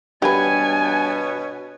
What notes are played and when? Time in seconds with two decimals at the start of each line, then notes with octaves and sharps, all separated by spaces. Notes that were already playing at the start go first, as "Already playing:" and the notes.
0.22 G2 B2 B3 G4 B4 C#5 G#5 A5